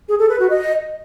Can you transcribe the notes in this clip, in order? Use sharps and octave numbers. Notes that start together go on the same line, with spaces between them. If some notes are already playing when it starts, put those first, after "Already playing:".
G#4
A4
B4
F#4
D#5